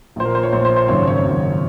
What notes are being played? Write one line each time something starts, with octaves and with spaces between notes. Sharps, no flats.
A#1 A#2 C5
A#4
C5
C#5
A#1 A#2 C5
C5
C5
G#1 F#2 C#3 C#5
C#5
G#1 F#2 C#3